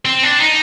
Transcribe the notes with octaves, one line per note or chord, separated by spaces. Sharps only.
C4
D4
D#4